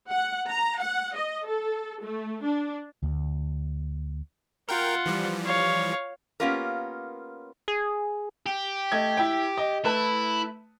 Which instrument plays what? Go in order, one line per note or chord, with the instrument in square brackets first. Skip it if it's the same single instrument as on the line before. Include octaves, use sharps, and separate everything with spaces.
[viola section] F#5
A#5
F#5
D#5
A4
A3
D4
[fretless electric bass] D2
[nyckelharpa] F4 F#5 [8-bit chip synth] A#4 G5
[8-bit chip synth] E3 F3 G3
[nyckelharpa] C#5 F5
[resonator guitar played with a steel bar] A#3 B3 C#4 F4 G4 A#4
[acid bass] G#4
[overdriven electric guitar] G4
[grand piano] A3 D#5 G#6
E4 G5
D#5
[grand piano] A3 B4 A5 [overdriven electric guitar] E4